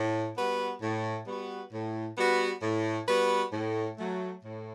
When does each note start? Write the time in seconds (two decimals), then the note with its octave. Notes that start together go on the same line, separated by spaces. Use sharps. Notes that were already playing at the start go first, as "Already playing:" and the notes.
Already playing: A2
0.36 G3 B3 F#4 B4
0.82 A2
1.27 G3 B3 F#4 B4
1.72 A2
2.17 G3 B3 F#4 B4
2.63 A2
3.07 G3 B3 F#4 B4
3.53 A2
3.98 F#3 A3
4.44 A2